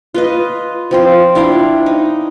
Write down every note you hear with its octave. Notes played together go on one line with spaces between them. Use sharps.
F4 B4 D#5
F3 C4 F4
D4 E4 F5 G5
D#4